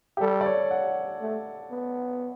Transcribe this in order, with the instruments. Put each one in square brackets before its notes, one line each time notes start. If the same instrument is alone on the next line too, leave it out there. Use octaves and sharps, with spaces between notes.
[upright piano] G4
[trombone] G3 [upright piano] A4
[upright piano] D5
C#5
F#5
[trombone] A3
B3